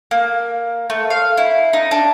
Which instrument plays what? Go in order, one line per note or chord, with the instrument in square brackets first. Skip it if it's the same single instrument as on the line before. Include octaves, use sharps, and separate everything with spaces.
[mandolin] A#3
A3
F5
E4
D#4
D4